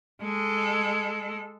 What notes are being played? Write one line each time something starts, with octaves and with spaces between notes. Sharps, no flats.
G#3 A4